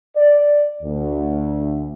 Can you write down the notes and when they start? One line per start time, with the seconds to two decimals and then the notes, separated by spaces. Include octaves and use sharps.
0.16 D5
0.83 D2